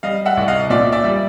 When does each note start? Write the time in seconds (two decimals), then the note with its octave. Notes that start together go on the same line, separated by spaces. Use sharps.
0.03 G3 D#5 F5
0.25 E5 F#5
0.37 C2
0.48 D#5 F5
0.70 A#2 D5 E5
0.92 D5 E5
1.04 G3